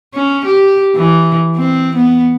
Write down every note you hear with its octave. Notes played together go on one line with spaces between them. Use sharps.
C#4
G4
E3
C4
B3